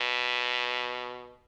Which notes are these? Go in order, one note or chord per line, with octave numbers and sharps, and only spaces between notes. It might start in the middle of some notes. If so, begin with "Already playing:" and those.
Already playing: B2